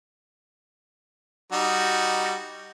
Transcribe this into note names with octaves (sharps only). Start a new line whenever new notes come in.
G3 D#4 F#4